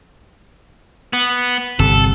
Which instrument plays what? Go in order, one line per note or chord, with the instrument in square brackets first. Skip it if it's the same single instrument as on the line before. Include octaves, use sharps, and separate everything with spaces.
[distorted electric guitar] B3
[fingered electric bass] G1 C3 [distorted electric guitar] A4